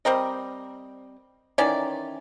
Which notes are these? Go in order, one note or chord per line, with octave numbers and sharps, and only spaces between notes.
G3 C4 A#4 D#5
D#3 E3 C#4 D5